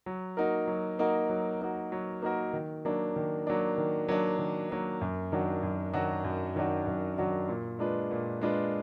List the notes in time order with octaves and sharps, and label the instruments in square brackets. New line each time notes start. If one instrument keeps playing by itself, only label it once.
[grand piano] F#3
A#3 D#4 F#4 A#4
F#3
A#3 D#4 F#4 A#4
F#3
A#3 D#4 F#4 A#4
F#3
A#3 D#4 F#4 A#4
D#3
F#3 A#3 D4
D#3
F#3 A#3 D4
D#3
F#3 A#3 D4
D#3
F#3 A#3 D4
F#2
D#3 F#3 D4 F#4
F#2
D#3 F#3 D4 F#4
F#2
D#3 F#3 D4 F#4
F#2
D#3 F#3 D4 F#4
A#2
G#3 D4 F4 B4
A#2
G#3 D4 F4 B4